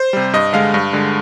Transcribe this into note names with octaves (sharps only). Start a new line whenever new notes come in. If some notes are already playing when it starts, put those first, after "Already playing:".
Already playing: C5
C3 G3
G2 D#5
D3 G#3 F5
G2
D3 G#3